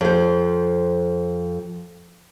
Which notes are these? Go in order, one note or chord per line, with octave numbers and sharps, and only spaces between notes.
F2 C5